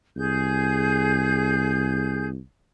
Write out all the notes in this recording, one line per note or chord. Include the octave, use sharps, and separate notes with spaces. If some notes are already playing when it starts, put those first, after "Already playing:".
C2 G#4 G6